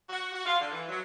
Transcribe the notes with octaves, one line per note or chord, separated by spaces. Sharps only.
F#4
F#4
F4
D3
E3
F#3